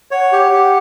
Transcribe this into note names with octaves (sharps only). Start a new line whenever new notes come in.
C#5 F#5
G4
G4